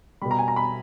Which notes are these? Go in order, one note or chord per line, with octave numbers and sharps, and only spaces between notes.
B2 G3 B5
A#5
G#5
A#5
B5